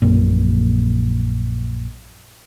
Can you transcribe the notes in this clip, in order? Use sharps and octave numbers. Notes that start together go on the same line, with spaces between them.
A#1 F#2 A#2